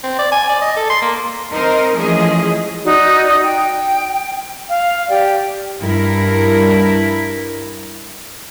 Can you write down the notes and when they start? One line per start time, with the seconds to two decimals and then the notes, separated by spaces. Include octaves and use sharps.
0.04 C4
0.19 D5
0.32 G#5
0.49 D5
0.61 D#5
0.76 A4
0.90 C6
1.02 A#3
1.51 C4 D#4 A#4 C5 D#5
1.96 E3 F3 A3 C#4 G#4 D#5
2.84 D#4 F#4 D5
3.43 G5
4.69 F5
5.09 G4 D5 G5
5.79 G2 E4 A#4